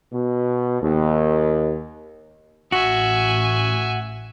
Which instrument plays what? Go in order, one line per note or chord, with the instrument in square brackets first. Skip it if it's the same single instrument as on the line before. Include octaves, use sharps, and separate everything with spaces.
[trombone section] B2
D#2
[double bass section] A1 [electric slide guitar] F#4 [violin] E5 G#5